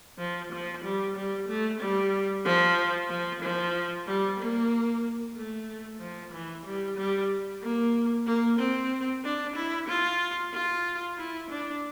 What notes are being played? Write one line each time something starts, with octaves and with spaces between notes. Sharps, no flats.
F3
F3
G3
G3
A3
G3
F3
F3
F3
G3
A#3
A3
F3
E3
G3
G3
A#3
A#3
C4
D4
E4
F4
F4
E4
D4